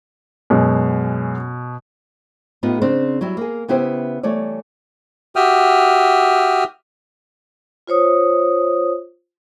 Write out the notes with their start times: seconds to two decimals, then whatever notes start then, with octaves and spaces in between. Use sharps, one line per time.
0.50 F#2 B2 G#3
2.63 A2 B3 D#4 F4 G4
2.82 C#3 C4 D4 C5
3.21 F#3 G3 E4
3.37 A#3 G#4
3.68 C#3 B3 E4 G4 C5
4.23 E3 G3 A3 C#5 D5
5.36 F#4 G4 E5 G5 D#6 F6
7.87 F4 C5 C#5 D#6